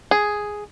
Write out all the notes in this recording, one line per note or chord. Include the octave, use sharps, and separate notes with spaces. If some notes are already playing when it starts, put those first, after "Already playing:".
G#4